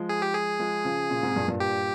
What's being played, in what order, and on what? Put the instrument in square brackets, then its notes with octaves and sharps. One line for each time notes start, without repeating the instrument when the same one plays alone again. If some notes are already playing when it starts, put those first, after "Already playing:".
Already playing: [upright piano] F3 G#3
[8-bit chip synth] G#4
G4
G#4
[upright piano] F3 G#3
C#3 F3
A#2 C#3
G#2 C3
G2 A#2
G2 A#2
[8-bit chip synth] G4